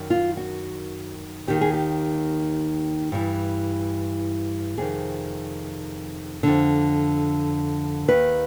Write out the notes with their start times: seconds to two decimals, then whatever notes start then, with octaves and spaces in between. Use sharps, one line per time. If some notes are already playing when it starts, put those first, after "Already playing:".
Already playing: F#2 D#3
0.10 F4
0.37 F#4
1.47 D#2 D#3 G4
1.61 G#4
1.74 G4
3.12 G2 E3
4.78 F2 C3 D#3 G#4
6.43 F2 D3
8.08 D#2 D#3 B4